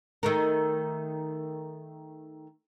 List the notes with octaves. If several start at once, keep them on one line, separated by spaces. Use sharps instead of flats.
D#3 A3 A#4